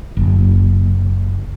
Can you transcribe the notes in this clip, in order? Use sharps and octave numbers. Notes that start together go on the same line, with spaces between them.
F#1